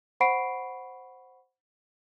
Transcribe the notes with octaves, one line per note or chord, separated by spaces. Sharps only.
C5 F#5 B5 C#6 C7 D7